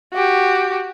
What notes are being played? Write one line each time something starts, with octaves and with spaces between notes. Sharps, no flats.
F#4 G4